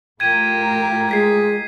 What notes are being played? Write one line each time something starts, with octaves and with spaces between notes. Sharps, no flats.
A2 F4 G4 A#4 G#6 D#7
G#3 G#6 B6 C7